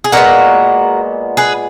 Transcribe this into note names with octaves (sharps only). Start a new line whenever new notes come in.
G#4
A#2 G#3 B3 F#4 A#4
G#4 B4